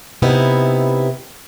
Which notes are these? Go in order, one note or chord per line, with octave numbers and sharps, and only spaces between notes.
C3 B3 D#4 E4